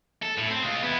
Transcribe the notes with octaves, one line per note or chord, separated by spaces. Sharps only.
A4
A2
C4
G#3 F4
B3 E4